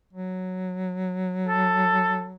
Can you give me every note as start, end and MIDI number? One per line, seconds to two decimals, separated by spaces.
0.13 2.36 54
1.47 2.27 69